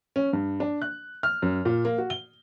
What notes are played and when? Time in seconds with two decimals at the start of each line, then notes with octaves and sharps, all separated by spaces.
0.16 C#4
0.33 G2
0.60 D4
0.82 F#6
1.23 F6
1.42 F#2
1.65 A#2
1.85 A#3
1.98 F#4
2.10 G7